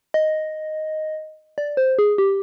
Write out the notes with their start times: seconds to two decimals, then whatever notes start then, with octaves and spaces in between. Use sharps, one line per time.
0.14 D#5
1.58 D5
1.77 C5
1.99 G#4
2.18 G4